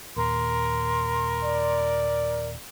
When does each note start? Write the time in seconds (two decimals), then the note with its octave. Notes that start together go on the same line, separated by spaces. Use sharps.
0.16 D#2 A#2 A#4 C6
1.44 D5